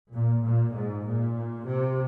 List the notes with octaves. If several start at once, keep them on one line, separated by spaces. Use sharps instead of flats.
A#2
A#2
G#2
A#2
C3